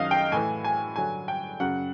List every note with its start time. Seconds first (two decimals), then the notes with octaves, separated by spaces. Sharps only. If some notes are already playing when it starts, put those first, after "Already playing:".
Already playing: F#2 D#3 F#3 D#5 F5
0.11 G5
0.32 A2 E3 G#5
0.64 G#5
0.96 G2 D3 F#3 G#5
1.28 G5
1.60 F#2 C#3 F#3 F#5